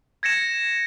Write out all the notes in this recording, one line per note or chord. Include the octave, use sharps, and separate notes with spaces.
G#6 A#6 C#7 E7